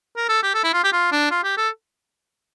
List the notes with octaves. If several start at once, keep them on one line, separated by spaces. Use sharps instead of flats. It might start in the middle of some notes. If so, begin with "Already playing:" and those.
A#4
A4
G4
A4
E4
F4
G4
F4
D4
F4
G4
A4